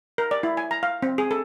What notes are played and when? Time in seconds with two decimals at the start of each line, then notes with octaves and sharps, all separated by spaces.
0.18 A#4
0.31 D5
0.43 E4
0.57 G#5
0.71 A#5
0.83 F5
1.02 C4
1.18 G#4
1.31 A4